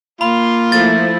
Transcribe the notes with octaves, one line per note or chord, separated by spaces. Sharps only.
A#3 F4 B5 C6
F3 A3 E4 A6